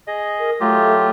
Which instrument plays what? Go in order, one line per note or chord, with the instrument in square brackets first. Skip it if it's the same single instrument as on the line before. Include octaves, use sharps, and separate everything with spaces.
[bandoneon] G#4 D#5
[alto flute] A#4
[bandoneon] F#3 F4 G4 [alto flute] A3